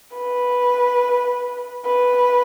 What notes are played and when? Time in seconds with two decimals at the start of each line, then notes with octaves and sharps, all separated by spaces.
0.16 B4
1.85 B4